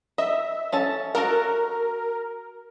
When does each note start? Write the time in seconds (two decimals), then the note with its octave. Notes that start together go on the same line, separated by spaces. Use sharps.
0.18 D#5 E5
0.72 C#4 A4 A5
1.15 F#4 A4 A#4 F#5